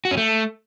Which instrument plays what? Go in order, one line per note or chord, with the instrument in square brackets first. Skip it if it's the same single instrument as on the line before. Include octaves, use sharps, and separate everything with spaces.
[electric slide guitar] F#4
C#4
A3